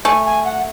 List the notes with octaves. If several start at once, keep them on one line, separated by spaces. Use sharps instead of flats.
A3 G#5
G#5
F#5